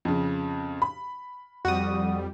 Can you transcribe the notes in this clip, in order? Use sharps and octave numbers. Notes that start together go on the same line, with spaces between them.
F2 C#3
B5
F2 G3 F#4 D#6